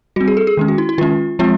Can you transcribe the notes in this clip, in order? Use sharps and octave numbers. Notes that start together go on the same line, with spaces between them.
G3 C4 F#4
G#4
A4
G#4
D#3 G#3 C#4
F#4
E4
E4
D#3 G#3 C#4 F4
F3 G#3 C4 F4